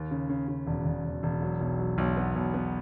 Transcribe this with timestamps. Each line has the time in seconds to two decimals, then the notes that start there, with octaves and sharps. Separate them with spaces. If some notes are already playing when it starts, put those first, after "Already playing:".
Already playing: D#2
0.11 C#3
0.29 C#3
0.48 C#3
0.67 E1
0.86 E1
1.04 E1
1.23 E1
1.42 F#3
1.61 B1
1.79 F#3
1.98 B1
2.17 B3
2.36 B1
2.54 B3